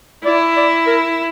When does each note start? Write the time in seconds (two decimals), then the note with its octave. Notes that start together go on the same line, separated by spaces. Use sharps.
0.25 E4 D5
0.57 D5
0.87 A#4